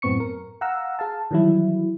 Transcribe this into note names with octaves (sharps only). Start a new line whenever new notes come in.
F#2 A2 B3 C4 C#6 C#7
A#4
F5 F#5 A#5 E6
G#4 F5 A5
D#3 E3 F#3 G3 E4